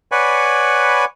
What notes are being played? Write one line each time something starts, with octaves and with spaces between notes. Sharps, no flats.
B4 C#5 D5 F#5 G#5 B5